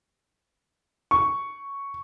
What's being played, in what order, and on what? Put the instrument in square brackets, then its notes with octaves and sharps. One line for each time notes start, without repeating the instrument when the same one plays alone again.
[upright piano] C#6